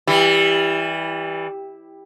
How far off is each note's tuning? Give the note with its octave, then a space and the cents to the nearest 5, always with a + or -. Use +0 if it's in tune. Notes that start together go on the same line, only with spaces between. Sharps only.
E3 -10 G3 +10